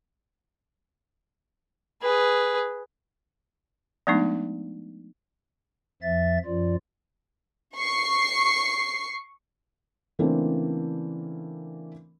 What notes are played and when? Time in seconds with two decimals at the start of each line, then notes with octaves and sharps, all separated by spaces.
2.02 G#4 B4
4.07 F3 G#3 A3 B3 D4 D#4
6.02 F2 F3 E5 A6
6.45 F#2 F3 F4 D5
7.76 C#6 C7
10.19 C#3 E3 A3 A#3 C4 D4